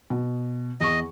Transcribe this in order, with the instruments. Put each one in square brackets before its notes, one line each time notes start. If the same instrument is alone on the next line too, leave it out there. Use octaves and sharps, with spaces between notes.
[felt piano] B2
[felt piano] E2 C#6 [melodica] D#5